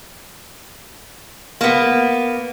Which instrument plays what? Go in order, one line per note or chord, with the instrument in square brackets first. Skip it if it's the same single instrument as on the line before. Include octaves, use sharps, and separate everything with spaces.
[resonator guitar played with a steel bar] A#3 B3